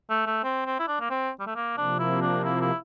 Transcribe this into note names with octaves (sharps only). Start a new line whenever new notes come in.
A3
A3
C4
C4
E4
D4
A#3
C4
G3
A3
A#3
C3 F3 A#3 D4
E4
D4
E4
E4